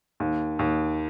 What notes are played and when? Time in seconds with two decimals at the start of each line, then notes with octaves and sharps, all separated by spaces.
0.20 D#2
0.59 D#2